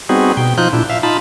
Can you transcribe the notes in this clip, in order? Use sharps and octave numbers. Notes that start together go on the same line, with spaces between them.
G3 B3 C4 D#4 F#4 G#4
B2 G5
F3 D#4 F4 F#6 G6
A#2 D4 E4
E5 F5
D#4 F4 A5 B5